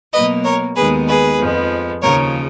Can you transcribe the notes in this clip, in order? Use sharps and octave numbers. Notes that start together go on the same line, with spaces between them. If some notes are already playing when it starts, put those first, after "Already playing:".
B2 F#3 A#3 B4 D#5
A#4 C#5
D#2 D#3 G#3 B3 G#4 B4
G#4 B4
F2 F3 G#3 B3
D#2 C#3 F3 A#4 C#5